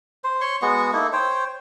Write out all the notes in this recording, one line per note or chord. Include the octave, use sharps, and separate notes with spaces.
C5
C#5 C6 C#6
G#3 B3 F#4 C#6
A#3 D#4 E4 A4
C5 C#5 G5